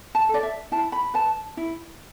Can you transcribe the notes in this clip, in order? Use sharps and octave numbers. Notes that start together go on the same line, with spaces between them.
A5
A4
D5
E5
E4 A5
B5
B4 A5
E4